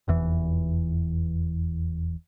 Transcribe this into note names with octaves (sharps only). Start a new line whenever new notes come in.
F1 E2 E3